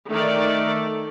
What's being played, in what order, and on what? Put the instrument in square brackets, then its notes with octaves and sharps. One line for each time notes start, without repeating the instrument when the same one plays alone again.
[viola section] D#3 D5 [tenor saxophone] A3